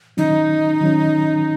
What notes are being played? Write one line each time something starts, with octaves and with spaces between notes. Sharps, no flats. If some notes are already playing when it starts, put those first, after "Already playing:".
D#3 F#3 C#4 D#4
D#3 F#3 C#4